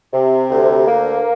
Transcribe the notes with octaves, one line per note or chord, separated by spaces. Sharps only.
C3
D2
A#3